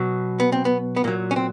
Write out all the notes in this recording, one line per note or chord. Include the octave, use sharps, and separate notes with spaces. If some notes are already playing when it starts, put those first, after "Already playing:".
Already playing: B2 F#3
B3
C4
B3
B3
A#2 F#3 A#3
C#4
C4